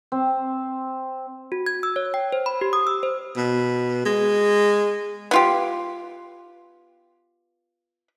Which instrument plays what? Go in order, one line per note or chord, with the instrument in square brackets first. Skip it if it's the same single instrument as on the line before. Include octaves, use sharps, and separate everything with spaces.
[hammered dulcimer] C4
[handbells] F#4
G#6
E6
C#5
G5
C5
B5
G4
D#6
E6
C5
[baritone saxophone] B2
G#3
[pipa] B3 F4 G4